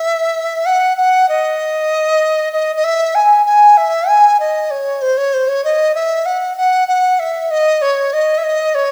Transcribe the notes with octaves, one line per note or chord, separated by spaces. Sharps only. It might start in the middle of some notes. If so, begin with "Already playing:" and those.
Already playing: E5
F#5
F#5
D#5
D#5
D#5
E5
G#5
G#5
E5
G#5
D#5
C#5
C5
C#5
C5
C#5
D#5
E5
F#5
F#5
F#5
E5
D#5
C#5
D#5
E5
D#5
C#5